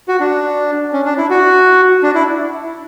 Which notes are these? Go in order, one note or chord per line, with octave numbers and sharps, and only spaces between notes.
F#4
D4
C#4
D4
E4
F#4
D4
E4